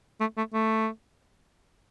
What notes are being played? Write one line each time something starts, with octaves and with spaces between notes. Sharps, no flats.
A3
A3
A3